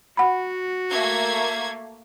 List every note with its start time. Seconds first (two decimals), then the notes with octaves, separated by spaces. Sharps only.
0.17 F#4 F#5 B5
0.90 A3 A#3 G#6